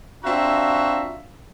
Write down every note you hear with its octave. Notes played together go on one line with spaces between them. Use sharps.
C4 D4 F4 F#4 E5 A#5